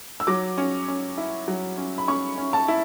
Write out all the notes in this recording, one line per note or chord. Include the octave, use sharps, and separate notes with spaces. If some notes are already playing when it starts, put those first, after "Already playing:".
E6
F#3 D6
C#4
C#4
E4
F#3
C#4
B5
C#4 C#6
C#4
A5
E4